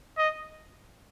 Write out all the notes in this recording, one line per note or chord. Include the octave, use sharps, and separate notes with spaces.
D#5